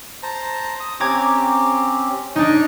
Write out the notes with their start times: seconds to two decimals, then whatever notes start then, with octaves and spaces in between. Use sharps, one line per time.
0.23 C5 A5 A#5
0.80 D#6
1.00 C4 C#4 G4 A#5 D6 G#6
2.36 D4 D#4 C#5 D#5 C#6